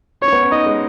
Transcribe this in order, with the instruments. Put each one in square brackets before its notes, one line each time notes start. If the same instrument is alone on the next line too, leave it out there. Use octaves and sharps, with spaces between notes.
[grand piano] C#4 [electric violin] C#5
[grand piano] B3
C#4
[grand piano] D#4 [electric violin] D#5
[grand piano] G#3